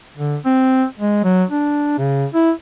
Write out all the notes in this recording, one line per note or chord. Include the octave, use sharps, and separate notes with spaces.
D3
C4
G#3
F#3
D4
C#3
E4